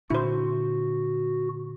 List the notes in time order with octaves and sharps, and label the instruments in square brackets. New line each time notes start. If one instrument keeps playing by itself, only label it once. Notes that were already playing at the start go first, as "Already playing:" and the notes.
[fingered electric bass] A#2 D3 D4 [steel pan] E4 C5 [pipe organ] F#4